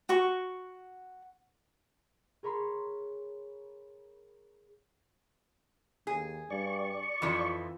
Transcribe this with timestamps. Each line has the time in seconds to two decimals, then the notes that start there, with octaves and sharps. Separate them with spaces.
0.09 F#4 C#6
2.43 G#4 A#4 C#5 B5 C6
6.07 D#2 G#4
6.50 G2 D5 C#6
7.22 F2 E3 F3 F4